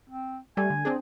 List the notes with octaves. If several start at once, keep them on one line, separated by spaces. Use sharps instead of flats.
C4
G3 A3 G#5
D3
C4 D4 G#4